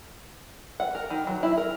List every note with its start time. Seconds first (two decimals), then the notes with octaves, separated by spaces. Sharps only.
0.80 F#5
0.95 A#4
1.10 D#3
1.27 F#3
1.43 E4
1.58 A#4